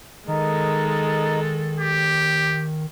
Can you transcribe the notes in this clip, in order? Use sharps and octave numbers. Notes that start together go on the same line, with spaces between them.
D#3 G#3 D#4 A4 A#4 D#5
G4 D6